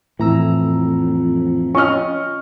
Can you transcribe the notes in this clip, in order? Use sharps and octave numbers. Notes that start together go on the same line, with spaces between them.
F2 A2 E3 A#5 E6
C#4 F4 D#5 C#6 F6